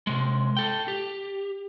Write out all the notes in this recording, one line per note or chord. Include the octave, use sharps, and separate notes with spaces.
C3 G#3
A4 G5
G4